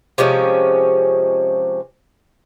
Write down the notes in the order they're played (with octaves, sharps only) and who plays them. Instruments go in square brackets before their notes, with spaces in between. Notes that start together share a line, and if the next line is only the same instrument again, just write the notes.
[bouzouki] C3 F3 G#3 C#4